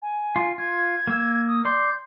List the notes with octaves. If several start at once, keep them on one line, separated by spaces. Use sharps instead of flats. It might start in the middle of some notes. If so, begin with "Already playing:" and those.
G#5
F4
F4 G#6
A#3 E6
D#6
D5 C6 G6